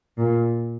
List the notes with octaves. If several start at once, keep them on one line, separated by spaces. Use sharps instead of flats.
A#2